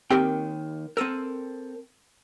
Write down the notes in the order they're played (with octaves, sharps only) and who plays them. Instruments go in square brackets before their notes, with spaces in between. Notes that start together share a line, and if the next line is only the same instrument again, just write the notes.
[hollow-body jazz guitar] D#2 D#3 G5 [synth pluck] C4 G4 A#4
[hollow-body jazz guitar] C4 A4 A#4 [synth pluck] E6 D#7